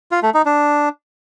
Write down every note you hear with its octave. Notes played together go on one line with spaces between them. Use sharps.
F4
A3
D#4
D4